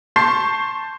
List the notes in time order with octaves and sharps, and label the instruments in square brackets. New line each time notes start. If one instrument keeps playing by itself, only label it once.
[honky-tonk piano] A5 C6 C#6 G6 C7